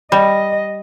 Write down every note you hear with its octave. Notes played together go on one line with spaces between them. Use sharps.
G3 D#5